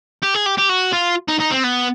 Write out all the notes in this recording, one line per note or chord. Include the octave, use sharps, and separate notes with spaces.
G4
G#4
G4
G4
F#4
F4
D#4
D#4
C4
B3